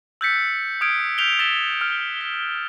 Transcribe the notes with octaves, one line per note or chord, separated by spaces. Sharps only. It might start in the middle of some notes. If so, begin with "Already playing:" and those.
E6 F#6 G6 A6 B6 C#7
D#6 F6 G#6 D7
F6 G6 B6 F7 G7
E6 A6 B6 E7 F7 G7
F6
B6